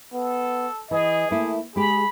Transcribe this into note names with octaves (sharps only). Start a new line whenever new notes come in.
B3 A4
E3 G#4 D#5
A3 A#3 E4
G#3 G4 G#4 B5